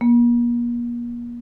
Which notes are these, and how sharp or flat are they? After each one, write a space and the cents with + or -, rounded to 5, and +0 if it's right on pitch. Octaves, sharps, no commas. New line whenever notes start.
A#3 +40